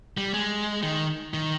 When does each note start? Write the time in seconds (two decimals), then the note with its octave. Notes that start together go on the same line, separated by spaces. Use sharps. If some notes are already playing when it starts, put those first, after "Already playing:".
0.17 G3
0.34 G#3
0.83 D#3
1.34 D#3